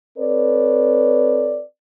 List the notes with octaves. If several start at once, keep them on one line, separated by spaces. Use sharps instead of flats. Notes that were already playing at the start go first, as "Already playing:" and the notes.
C4 A4 B4 C#5 D5